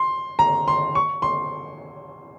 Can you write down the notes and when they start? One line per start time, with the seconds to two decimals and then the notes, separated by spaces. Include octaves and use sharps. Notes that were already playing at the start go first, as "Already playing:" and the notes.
Already playing: C6
0.39 A#5
0.68 C6
0.95 C#6
1.22 C6